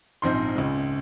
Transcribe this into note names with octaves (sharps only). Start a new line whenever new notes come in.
A#1 G#2 F3 C4 D#4 C6
C#2 C#3 G#3